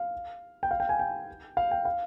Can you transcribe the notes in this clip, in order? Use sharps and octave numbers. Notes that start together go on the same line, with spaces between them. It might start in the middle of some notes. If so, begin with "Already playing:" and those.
Already playing: F5
G5
F5
G5
G#5
G5
F5
G5
F5